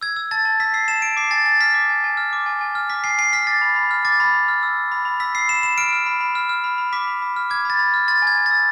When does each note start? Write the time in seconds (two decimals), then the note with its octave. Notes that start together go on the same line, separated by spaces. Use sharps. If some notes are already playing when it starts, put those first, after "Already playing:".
0.01 E6 G#6
0.16 E6
0.31 A5 A6
0.45 A5
0.60 E6 B6
0.74 E6 C7
0.88 A5 E7
1.02 A5 D7
1.17 D6 C7
1.31 G#5 A6
1.46 G#5 A6
1.61 F6 B6
1.74 D6
1.90 G#5
2.04 G#5
2.17 F6
2.33 D6
2.46 G#5
2.61 G#5
2.75 F6
2.90 D6 B6
3.04 G#5 C7
3.18 G#5 C7
3.33 F6 B6
3.47 D6 A6
3.62 B5
3.76 B5
3.91 F6
4.05 D6 A6
4.20 B5
4.34 B5
4.48 F6
4.63 E6
4.77 E6
4.92 B5
5.05 B5
5.20 E6 B6
5.35 E6 C7
5.48 B5 E7
5.63 B5 E7
5.78 F6 D7
5.93 F6
6.06 B5
6.21 B5
6.35 F6
6.49 F6
6.64 B5
6.78 B5
6.93 D6 B6
7.07 B5
7.22 B5
7.36 F6
7.50 D6 G#6
7.65 B5 A6
7.79 B5
7.94 F6
8.08 C6 A6
8.22 G#5 G#6
8.37 G#5
8.46 E6 A6